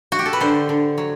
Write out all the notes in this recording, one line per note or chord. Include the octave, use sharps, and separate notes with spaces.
F#4
G4
A4
B4
D3 C5
D3
F#3